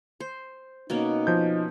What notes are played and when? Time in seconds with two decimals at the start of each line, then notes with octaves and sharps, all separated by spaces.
0.20 C5
0.90 B2 A#3 C#4 D#4
1.27 F3 G6